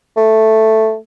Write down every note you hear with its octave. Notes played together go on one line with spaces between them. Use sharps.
A3